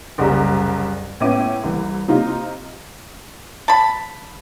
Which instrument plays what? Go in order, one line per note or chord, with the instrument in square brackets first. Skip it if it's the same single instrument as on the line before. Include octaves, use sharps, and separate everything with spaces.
[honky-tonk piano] F#1 C2 C#3 G3 A#5
A2 B3 C#4 E4 D6 D#7
C2 E3
C3 D#4 F4
[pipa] A5 B5